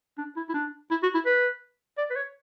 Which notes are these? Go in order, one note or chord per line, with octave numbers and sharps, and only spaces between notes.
D4
E4
E4
D4
E4
F#4
E4
B4
D5
B4
C#5